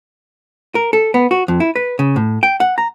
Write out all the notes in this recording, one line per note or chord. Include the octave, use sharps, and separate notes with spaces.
A#4
A4
B3
F#4
F2
E4
B4
C#3
A2
G5
F#5
A#5